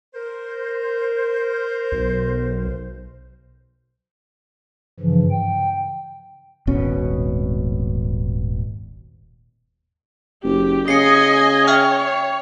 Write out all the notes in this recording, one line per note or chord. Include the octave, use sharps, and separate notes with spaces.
A#4 C5
B1
G2 C#3 E3 F3
G5
D#1 G#1 B2 C#4
F#1 G4
C#3 D#5 G#5 C7 C#7
C#5 E5 G5 F6